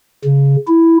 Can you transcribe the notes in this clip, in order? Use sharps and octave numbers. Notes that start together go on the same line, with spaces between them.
C#3
E4